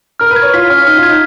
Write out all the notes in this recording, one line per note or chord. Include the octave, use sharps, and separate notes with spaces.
A#4 F6
B4
G#6
C#5
F4 B6
C#4 F6
D#4 F6
F4
G#6
D#4